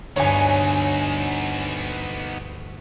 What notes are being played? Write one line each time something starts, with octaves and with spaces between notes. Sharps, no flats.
D2 G2 B3 D#4 C#5 G#5